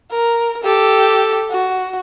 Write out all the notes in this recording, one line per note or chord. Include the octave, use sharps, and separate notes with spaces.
A#4
G4 A4
F#4